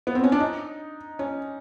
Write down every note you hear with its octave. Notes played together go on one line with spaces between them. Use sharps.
B3
C4
C#4
D4
D#4
C#4